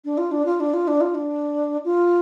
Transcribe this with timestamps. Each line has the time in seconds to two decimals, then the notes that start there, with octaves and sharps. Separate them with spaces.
0.05 D4
0.18 F4
0.31 D4
0.46 F4
0.60 D4
0.74 F4
0.88 D4
1.01 F4
1.15 D4
1.85 F4